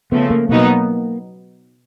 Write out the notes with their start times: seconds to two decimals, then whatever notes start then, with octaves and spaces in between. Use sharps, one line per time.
0.12 C#3 F3 A3 B3
0.30 A#3
0.49 B2 F#3 A#3 B3 D#4